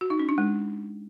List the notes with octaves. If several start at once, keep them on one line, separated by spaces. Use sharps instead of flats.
F#4
D#4
C#4
D4
G#3